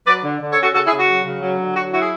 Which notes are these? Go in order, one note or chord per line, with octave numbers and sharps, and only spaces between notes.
F#3 B4 D5
D3
D3
A4 C#5
C#4
F#4 A4
C#3 F#4 A4
E4 G#4
C#3
F#4
F#3
C#3
F#3
D3
F#3 F#4
E4 F#4
G#4